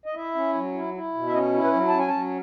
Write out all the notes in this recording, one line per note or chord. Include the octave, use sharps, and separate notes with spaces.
D#5
E4 E5
C#4
F#3
E4
E4
B2
E5
C#4 D#5
E4
B4
F#3
C#4 A5
G#5
F#3 A5